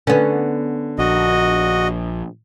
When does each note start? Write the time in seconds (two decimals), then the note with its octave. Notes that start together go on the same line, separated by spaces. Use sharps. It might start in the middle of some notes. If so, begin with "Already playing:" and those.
0.07 D3 B3 C#4
0.99 A#1 F#4 D#5